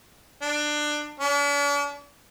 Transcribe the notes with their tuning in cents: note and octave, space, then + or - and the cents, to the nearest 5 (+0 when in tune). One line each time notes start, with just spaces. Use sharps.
D4 +20
D4 -45